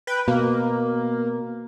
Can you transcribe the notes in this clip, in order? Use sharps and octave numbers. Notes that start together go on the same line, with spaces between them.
B4 G5
B2 A#3